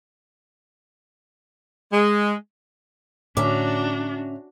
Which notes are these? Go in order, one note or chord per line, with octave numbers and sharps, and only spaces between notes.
G#3
A2 D3 C#4 D4 F#4 E5 A#5 D6